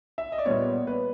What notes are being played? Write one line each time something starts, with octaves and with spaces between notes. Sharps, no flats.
E5
D#5
D5
A#2 G3 B3 C#5
B4